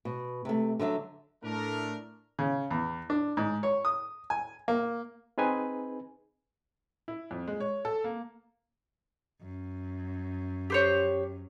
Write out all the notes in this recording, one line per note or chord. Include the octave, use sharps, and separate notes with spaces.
B2
C3 A3
D3 F#3 D#5 E5
A2 A3 D4 A#4
C#3
E2
D4
G#2
C#5
D#6
G#5
A#3
C4 D#4 G#4 B4 G#5
E4
F2
G#3
C#5
A4
A#3
F#2
G4 C5 C#5